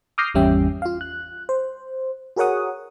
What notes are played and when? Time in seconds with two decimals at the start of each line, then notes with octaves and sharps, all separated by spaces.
0.18 D6 D#6 F6 G6 A#6 C7
0.34 G#1 E2 G3 C#4 E5 G5
0.82 F4 F5
1.01 F#6
1.49 C5
2.36 F#4 G#4 A#4 C#5 F#5 D#6